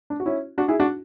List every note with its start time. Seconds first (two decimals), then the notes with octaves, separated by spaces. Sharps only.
0.10 D4
0.20 F#4
0.26 C#4 E4
0.58 D4 F#4
0.68 E4 G#4
0.80 D4 F#4